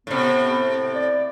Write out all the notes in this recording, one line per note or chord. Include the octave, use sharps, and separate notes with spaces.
A2 C3 B3
D5